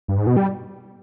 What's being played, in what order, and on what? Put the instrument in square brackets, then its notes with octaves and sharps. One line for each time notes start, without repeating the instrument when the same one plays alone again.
[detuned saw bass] G2
G#2
B2
G3